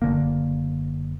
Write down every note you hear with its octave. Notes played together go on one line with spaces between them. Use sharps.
F#1 D3 A#3